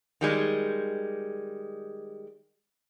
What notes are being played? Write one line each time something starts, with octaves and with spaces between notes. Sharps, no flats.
D#3 G3 G#3